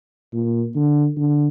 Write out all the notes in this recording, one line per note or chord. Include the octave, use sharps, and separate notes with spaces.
A#2
D3
D3